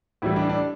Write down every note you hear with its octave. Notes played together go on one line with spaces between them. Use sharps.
A2 E3 G3 E4
D4
D4